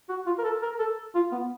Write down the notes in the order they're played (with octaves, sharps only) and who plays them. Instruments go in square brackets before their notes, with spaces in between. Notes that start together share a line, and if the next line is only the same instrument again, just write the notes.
[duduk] F#4
F4
A#4
A4
A#4
A4
F4
B3